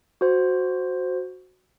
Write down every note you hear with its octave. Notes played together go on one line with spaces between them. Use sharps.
F#4 C5